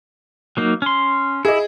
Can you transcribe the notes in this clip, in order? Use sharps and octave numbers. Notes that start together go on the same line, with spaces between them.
F#3 A#3 D#4
C#4 C6
E4 G#4 D#5